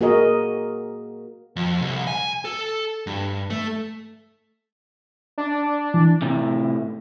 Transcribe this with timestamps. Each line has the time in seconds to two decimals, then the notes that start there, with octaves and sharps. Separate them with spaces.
0.01 A#3 F#4 G#4 A#4 D#5
1.56 F2
1.82 C2
2.07 G#5
2.45 A4
3.07 G2
3.50 A3
5.38 D4
5.94 E3
6.22 A2 C3